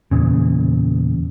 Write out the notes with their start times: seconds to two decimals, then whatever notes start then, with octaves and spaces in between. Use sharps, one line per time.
0.11 E2 A#2 C#3